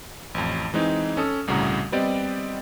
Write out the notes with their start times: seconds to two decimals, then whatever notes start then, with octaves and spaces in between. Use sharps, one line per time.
0.35 A1 F2
0.74 E3 G#3 C4 D#4
1.17 C#4 A4 D#6
1.47 G1 C2 A2 C#3 F#4 A#5
1.92 G3 B3 C4 G4 D5 D#5